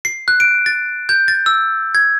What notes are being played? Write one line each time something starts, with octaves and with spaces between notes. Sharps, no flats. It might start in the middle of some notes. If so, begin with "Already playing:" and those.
C7
F#6
D7
A6
G6
A6
E6
G#6